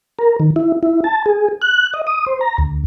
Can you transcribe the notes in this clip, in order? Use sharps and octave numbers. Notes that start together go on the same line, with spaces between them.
A#4
D#3
E4
E4
A5
G#4
F#6
D#5
D#6
C5
A#5
D2